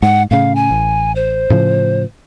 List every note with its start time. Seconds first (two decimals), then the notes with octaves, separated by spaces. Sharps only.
0.02 G#2 F#5
0.31 A2 C#3 F5
0.55 G#5
0.71 A1
1.16 C5
1.50 A2 C#3 F3